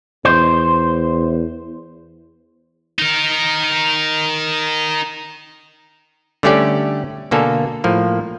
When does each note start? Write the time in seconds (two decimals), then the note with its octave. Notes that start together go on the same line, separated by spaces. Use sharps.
0.25 E2 C5
2.99 D#4 A#4
6.43 D3 G3 A3 C#4 G4 D5
7.31 B2 D3 A#3 A4 G#5
7.84 A2 F3 A#3